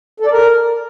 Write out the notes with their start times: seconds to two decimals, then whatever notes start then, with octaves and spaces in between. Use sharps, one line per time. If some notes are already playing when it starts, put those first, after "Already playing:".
0.20 A4
0.26 D5
0.32 A#4